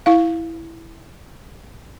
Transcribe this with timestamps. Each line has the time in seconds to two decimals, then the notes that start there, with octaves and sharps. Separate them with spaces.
0.06 E4 F5